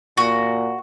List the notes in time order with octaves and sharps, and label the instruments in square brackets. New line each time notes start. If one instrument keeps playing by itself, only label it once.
[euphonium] A#2 [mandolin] F#4